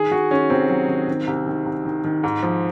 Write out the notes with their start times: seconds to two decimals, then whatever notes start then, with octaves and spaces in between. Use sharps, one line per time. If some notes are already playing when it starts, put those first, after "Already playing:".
Already playing: D#3 G#4
0.11 D#3 F#4
0.31 D#3 C#4
0.50 C2 C4
0.70 F#3
0.89 D#3
1.08 D#3
1.27 C2
1.47 D#3
1.66 C2
1.85 D#3
2.04 D#3
2.23 G#2
2.43 F3